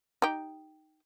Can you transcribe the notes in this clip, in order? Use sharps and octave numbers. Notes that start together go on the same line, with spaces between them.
D#4 G4